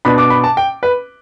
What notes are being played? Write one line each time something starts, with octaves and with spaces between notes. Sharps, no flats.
B2 B3 D4 B5
D6
B5
A5
G5
B4